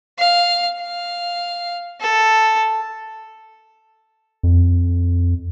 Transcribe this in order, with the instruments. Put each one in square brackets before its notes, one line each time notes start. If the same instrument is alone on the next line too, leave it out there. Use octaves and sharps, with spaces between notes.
[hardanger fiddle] F5
F5
A4
[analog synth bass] F2